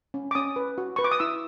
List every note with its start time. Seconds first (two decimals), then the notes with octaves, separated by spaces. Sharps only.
0.14 C#4
0.31 D6
0.35 C#4 D#6
0.56 B4
0.78 F#4
0.96 B4 C#6
1.04 D6
1.11 D#6
1.20 E4 E6